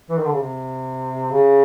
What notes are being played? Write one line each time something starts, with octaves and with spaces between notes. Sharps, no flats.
E3
D#3
D3
C#3
C3
C#3